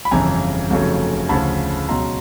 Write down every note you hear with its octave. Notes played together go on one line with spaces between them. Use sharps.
B5
G1 F2 C#3 E3 G#5 A#5
F1 F2 C#3 F#3 A3
D2 C#3 F3 A5 B5
C#2 B2 F#3 A#5 C6